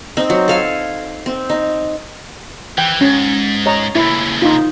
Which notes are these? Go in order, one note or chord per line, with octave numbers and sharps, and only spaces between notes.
C4 D#4
F#3
A4 F5 G#5
C4
D#4
E3 G5
G#2 C#4
C#5 D#5 A#5
A#2 C#3 E4
D#4 F4